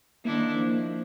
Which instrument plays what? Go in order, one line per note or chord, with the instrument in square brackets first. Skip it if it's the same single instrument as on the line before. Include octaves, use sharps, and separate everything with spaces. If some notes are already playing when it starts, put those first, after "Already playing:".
[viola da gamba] D#3 D4 E4 [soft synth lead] A#3
[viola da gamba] F3